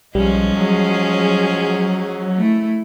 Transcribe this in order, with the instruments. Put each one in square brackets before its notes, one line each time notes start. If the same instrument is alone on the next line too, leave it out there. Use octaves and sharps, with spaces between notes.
[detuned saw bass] B1 [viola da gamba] F3 G#3 C#4 [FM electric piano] G3
[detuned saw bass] F#3 [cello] G#4
[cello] A3 E4